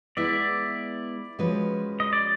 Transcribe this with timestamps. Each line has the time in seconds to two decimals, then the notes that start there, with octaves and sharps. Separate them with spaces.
0.17 G#3 B3 E4 D5 E5
1.39 F3 G#3 C#4 F#4 B4
2.00 D#5
2.13 D5